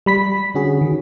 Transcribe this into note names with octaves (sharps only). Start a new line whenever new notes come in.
G3 B5 B6
D3 C#4 F#4 G#4
D#3